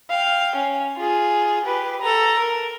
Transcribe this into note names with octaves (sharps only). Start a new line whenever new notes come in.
F5 G5
C#4
F4 G#4
G4 B4
A4 A#5
A#4